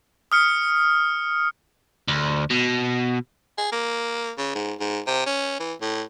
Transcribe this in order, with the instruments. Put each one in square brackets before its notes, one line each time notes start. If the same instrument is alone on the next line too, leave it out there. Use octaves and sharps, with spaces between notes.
[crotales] D#6 F6 C#7
[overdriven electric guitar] D2
B2
[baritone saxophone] G#4
A#3
C#3
G#2
G#2
C3
C#4
E3
A2